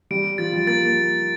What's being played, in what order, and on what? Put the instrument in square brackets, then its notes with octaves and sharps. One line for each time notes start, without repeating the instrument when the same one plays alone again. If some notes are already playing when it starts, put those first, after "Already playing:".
[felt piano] G3 [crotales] D7
[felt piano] F3 [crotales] A6
[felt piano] G3
[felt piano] A#3 [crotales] A6
[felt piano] A#3